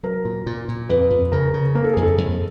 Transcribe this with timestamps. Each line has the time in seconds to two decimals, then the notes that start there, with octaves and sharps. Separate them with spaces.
0.03 F#3 A#4
0.25 A#2
0.46 A#2
0.68 A#2
0.89 F2 B4
1.11 F2
1.32 C#3 A#4
1.54 C#3
1.75 A#3 A#4
1.84 A4
1.93 F2 G#4
2.02 A4
2.18 F2